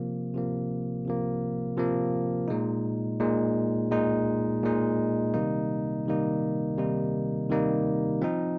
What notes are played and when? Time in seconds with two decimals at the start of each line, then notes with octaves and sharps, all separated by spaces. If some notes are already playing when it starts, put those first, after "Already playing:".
Already playing: C3 F3 A#3
0.34 C3 F3 A#3
1.05 C3 F3 A#3
1.76 C3 F3 A#3
2.48 A#2 G#3 D#4
3.20 A#2 G#3 D#4
3.92 A#2 G#3 D#4
4.63 A#2 G#3 D#4
5.34 C3 D#3 G3 A#3 D#4
6.06 C3 D#3 G3 A#3 D#4
6.78 C3 D#3 G3 A#3 D#4
7.49 C3 D#3 G3 A#3 D#4
8.22 F3 C4 D#4